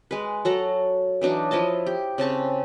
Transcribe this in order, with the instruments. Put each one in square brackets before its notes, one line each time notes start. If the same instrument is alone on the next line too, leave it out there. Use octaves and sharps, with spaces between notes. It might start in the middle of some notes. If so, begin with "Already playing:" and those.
[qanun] G#3 B4
F#3 A4 F#5 A#5
E3 F#3 D4 D#4
F3 E4 D#5 A5
G4
C#3 C4 A5 C#6